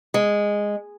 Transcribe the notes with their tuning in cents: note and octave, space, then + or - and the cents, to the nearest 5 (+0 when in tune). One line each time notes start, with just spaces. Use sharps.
G#3 -10